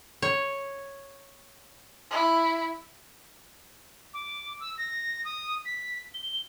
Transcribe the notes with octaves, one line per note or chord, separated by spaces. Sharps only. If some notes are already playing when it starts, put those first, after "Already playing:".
C#5
E4
D6
E6
A#6
D#6
B6
G7